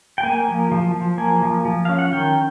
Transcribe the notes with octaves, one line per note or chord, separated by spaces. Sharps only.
G5
A#3 G#5
F3
F3
F3
A#3 G#5
F3
F3
C#4 F5
F#5
D#3 G5